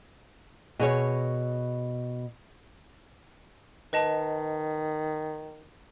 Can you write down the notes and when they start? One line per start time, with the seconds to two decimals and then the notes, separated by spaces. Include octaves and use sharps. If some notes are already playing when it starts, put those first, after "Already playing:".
0.79 B2 G#4 C#5
3.93 D#3 B4 D#5 A5